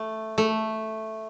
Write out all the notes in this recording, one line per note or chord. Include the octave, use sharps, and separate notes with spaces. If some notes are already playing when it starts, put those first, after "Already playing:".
Already playing: A3
A3